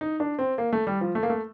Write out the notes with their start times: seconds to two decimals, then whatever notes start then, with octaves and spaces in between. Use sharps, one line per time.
0.01 D#4
0.20 D4
0.39 C4
0.58 A#3
0.73 A3
0.87 G3
1.01 F3
1.15 A3
1.23 A#3
1.30 A3